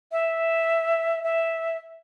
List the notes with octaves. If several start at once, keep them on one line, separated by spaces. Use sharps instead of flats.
E5
E5